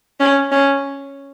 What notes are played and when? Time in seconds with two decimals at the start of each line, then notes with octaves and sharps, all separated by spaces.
0.20 C#4
0.52 C#4